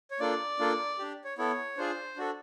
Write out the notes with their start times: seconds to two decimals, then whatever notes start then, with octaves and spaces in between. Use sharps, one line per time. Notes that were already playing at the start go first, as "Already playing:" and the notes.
0.11 C#5
0.20 A#3 D4 F4 A4 D5
0.59 A#3 D4 F4 A4
0.99 D4 G4
1.24 C#5
1.38 B3 E4 A4 C#5
1.77 D4 F4 G#4 C5
2.17 D4 F#4 A4